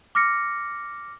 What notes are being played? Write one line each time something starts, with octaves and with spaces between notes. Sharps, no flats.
D6 F6 A#6 C#7